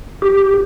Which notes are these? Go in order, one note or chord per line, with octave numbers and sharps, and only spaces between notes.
G4